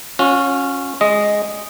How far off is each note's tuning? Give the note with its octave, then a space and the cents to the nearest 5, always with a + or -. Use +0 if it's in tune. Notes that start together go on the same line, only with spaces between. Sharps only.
C#4 -10 F4 +45
G#3 +0 D#5 +0